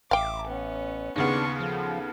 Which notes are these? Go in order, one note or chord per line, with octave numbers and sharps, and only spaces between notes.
A1 E5 F5 G5 D6
B3 C#4
D#2 C#3 B3 D4 C6 C#6
F3 A4